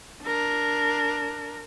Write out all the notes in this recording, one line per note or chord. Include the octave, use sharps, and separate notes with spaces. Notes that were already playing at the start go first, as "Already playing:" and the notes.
D4 A#4